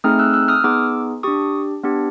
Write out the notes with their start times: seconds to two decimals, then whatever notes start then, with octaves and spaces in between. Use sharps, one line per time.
0.04 A3 C4 D#4 G#4 D#6 F6
0.19 E6 F#6
0.33 E6 F#6
0.48 D#6 F6
0.64 B3 D#4 G#4 D6 E6
1.23 D4 G4 C#6 D#6
1.83 B3 D4 G4